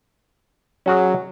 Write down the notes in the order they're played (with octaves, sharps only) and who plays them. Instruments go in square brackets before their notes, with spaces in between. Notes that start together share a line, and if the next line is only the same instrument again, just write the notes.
[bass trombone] F#3 [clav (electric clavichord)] C#4 F#4 G#4